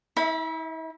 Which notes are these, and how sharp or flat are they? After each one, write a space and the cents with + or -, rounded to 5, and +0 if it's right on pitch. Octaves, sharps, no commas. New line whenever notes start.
E4 -40 E5 +0